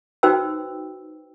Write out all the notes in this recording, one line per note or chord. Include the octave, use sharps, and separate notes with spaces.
D#4 F#4 B4 C5 G5 E6